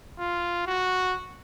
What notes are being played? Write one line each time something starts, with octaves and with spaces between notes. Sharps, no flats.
F4
F#4